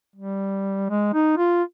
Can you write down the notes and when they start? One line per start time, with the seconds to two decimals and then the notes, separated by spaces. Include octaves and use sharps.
0.16 G3
0.89 G#3
1.14 D#4
1.37 F4